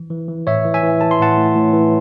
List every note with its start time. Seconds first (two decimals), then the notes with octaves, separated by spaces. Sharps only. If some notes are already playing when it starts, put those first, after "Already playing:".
Already playing: E3
0.10 E3
0.28 E3
0.47 A2 C#5 E5
0.65 E3
0.74 E5 G#5
0.83 E3
1.01 E3 A5
1.11 C6
1.20 A2 F#5 A5
1.37 A2
1.55 A2
1.73 E3